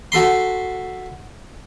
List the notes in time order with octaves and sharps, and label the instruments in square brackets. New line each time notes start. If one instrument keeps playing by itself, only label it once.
[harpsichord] F#4 A4 B5 C6